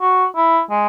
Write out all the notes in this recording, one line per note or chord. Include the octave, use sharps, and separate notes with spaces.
F#4
E4
G#3